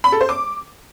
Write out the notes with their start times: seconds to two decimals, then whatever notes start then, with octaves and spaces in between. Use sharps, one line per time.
0.04 B5
0.12 A4
0.21 C5
0.29 D6